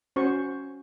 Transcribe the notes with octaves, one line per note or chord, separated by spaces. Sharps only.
C#4 F#4 C5 C#6